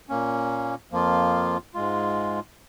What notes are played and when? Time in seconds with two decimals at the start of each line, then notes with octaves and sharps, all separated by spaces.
0.09 A#2 A#3 C#4
0.91 F2 F3 A#3 F4
1.74 G#2 G#3 F4